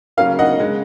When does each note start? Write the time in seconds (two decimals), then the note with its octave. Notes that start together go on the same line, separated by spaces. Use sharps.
0.17 C#3 F#3 A#3 F5
0.39 D#5 F#5
0.60 C#3 G#3